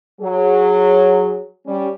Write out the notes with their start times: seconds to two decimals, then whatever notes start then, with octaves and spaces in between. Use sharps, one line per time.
0.21 F#3 G#4
1.66 G3 C#4